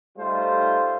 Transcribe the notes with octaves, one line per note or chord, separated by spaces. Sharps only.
G3 A3 D#4 F4 C5